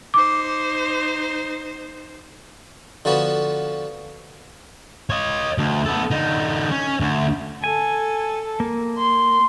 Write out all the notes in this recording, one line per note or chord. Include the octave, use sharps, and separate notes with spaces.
D#4 C5 D6
D3 F3 B3 F#4
C#5 D#5
D2
B3 A4
D3 D#4
C#4
D2
A4 G#5
A#3
C6